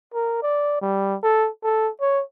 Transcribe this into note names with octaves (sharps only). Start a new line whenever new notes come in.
A#4
D5
G3
A4
A4
C#5